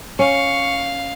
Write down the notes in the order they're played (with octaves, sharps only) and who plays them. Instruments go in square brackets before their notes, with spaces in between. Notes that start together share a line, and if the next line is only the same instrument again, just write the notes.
[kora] C#4 [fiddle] F5 [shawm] C#6